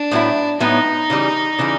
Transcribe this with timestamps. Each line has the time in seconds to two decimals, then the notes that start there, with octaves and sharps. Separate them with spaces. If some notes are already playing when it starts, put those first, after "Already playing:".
Already playing: D4
0.11 A2 F#3 B3 E4
0.60 A2 F#3 B3 D#4 E4
1.10 C#3 E3 G3
1.59 C#3 E3 G3